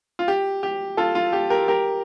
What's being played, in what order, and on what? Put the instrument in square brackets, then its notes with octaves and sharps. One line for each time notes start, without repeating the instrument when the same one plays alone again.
[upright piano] F4
G4
G4
F4 A4
F4
G4
G4 A#4
G4 A#4